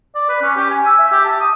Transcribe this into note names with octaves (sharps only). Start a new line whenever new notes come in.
D5
B4
C#4
G4
G#5
E6
E5
G4
A5
D#6